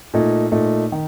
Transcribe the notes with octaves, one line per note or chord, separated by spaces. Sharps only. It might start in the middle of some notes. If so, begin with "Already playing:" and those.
A#2 A3 D#4
A#2 A3 D#4
D#3